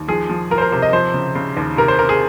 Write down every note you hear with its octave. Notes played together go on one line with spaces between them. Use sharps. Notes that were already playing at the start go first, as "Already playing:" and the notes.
Already playing: D#2
F3 G#4
F3
F3 A#4
C5
A#4
C3 C5
D#5
F3 C5
C#3
C#3
D#2
C3 A#4
C5
C3 A#4
G#4